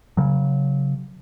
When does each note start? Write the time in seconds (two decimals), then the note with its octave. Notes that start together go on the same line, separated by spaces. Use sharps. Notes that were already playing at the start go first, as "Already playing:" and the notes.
0.17 C#3 F#3